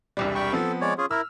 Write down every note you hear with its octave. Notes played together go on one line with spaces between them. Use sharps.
E1 C2 G3
G5 B5 C#6
F3 B3 C4 A4
G#3 C#5 D5
C#4 F4 G#4
E4 A#4 E6 F6